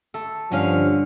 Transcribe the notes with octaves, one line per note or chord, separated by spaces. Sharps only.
A3 A4
G2 D3 F3 C#4 F5